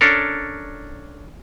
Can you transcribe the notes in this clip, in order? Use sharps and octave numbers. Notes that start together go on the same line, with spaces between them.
C#4 D4 A4 A#4